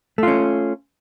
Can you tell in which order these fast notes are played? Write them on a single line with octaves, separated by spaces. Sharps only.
A3 F4 C#4